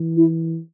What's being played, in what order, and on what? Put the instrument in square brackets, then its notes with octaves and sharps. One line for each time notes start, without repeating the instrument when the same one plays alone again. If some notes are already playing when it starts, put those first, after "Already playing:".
Already playing: [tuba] E3
[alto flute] E4